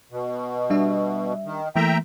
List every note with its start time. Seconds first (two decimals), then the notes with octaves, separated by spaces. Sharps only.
0.11 B2
0.70 G3 D4 E5
1.45 D#3
1.76 E3 A3 A#3 E5 G5 A#5